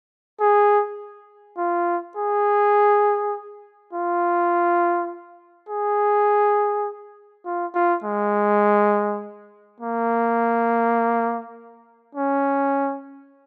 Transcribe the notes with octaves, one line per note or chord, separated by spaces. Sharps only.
G#4
F4
G#4
F4
G#4
F4
F4
G#3
A#3
C#4